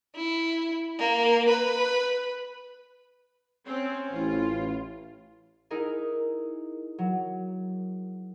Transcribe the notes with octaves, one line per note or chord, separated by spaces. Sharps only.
E4
A#3
B4
C4 C#4 C#5
A1 E4 F4
D#4 E4 G#4 A#4
F#3